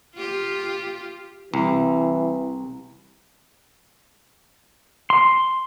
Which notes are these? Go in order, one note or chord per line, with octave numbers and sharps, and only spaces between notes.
F4 G4
C2 E3
C6